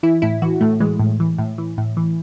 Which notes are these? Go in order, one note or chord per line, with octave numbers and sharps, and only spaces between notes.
E3 E4
A2 E4
E3 F#4
A2 A3
E3 G#3
A2
E3
A2
E3
A2
E3